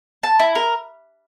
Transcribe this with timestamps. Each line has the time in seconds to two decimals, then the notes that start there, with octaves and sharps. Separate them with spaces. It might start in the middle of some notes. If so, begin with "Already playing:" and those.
0.23 A5
0.39 E4
0.55 A#4